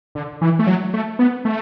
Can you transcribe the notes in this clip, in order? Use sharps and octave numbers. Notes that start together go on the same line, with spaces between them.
D3
E3
A3
F#3
A3
B3
A3